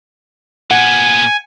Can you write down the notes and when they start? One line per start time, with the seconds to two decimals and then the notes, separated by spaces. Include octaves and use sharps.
0.71 A#2 B3 F#5 G#5